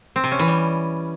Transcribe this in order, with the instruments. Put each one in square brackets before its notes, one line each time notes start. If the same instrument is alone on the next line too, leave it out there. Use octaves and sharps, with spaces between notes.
[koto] C4
C3
C#4
E3
G3